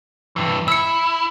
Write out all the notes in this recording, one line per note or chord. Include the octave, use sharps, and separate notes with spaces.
G2 E3
E4 E6 C#7